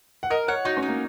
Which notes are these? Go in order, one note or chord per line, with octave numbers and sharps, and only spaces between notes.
F#5
A#4 D#5
C#5 F#5
D#4 F#4
C#4
D#4
A#3